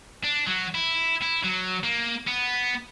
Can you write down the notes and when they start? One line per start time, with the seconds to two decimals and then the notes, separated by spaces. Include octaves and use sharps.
0.24 D4
0.47 F#3
0.75 E4
1.22 E4
1.44 F#3
1.84 A#3
2.27 B3